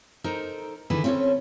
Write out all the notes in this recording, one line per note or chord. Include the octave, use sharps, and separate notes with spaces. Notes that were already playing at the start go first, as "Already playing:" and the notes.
D#4 A4 A#4 C5
D3 D#3 D#4 E4 G#4 B4
C4 C#4 E4 F4 A4 C#5